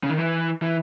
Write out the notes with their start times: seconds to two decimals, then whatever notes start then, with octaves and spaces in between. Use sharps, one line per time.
0.03 C#3
0.10 D#3
0.18 E3
0.62 E3